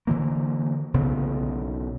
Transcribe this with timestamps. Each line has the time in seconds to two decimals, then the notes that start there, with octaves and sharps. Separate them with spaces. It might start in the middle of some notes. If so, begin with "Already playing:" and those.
0.07 D3 E3 A#3
0.94 B1 C#3 B3